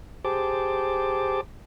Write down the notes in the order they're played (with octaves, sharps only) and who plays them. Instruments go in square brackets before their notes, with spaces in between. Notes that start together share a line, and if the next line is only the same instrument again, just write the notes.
[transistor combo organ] G4 G#4 C5 A5 D6